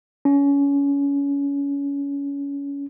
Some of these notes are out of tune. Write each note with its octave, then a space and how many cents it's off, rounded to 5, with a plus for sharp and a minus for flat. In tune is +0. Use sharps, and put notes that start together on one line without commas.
C#4 +25